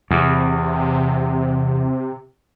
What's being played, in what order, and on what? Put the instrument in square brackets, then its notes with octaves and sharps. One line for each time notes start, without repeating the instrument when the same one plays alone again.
[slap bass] E2 [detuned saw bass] C3